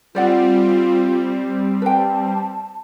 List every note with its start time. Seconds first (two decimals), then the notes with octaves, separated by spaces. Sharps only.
0.15 G3 C4 F4 C5 D5 F#5
1.82 B4 G5 A5